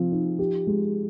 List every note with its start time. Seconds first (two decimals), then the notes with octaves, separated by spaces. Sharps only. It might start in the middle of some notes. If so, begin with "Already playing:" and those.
Already playing: C3 F3 C4
0.12 D#4
0.39 G4
0.67 G#3